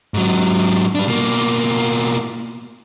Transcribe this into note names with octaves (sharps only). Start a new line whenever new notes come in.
G#2 F#3
G3 D4
B2 A#3